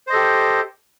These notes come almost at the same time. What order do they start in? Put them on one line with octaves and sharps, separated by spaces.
C5 D#5 A4 G4